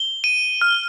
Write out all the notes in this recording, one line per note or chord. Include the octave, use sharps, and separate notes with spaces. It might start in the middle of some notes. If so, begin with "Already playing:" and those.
Already playing: G7
D#7
F6